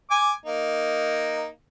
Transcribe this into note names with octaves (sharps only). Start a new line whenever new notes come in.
G#5 D6
A#3 D#4